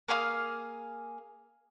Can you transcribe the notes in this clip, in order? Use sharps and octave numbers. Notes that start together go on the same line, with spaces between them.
A#3 G#4 F5 D#6